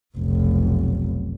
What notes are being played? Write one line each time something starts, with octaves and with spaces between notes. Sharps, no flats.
F1 B1